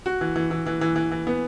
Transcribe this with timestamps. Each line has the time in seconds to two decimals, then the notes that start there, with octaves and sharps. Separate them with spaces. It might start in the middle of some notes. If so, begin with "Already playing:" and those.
0.06 F#4
0.21 E3
0.36 E3
0.51 E3
0.66 E3
0.81 E3
0.96 E3
1.11 E3
1.27 B3